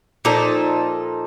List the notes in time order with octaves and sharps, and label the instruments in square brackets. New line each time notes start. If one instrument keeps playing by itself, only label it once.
[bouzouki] A#2 F3 D#4 A4